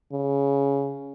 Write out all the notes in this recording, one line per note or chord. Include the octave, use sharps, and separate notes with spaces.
C#3